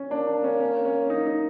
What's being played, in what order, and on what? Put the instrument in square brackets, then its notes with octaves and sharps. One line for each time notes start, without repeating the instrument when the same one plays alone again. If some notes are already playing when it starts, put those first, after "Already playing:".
Already playing: [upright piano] C#4
[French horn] A#3 [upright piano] D4
[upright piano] D4
C#4
C#4
C#4
D#4
D#4